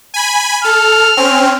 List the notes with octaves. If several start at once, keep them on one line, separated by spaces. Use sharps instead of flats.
G#5 B5
A4 F6
C4 C#4